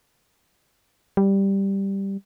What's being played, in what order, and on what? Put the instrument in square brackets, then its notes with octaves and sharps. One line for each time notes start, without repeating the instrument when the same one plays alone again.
[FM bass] G3